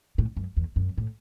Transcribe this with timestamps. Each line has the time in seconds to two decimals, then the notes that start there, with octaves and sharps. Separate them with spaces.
0.18 A2
0.37 F#2
0.57 E2
0.76 F#2
0.98 A2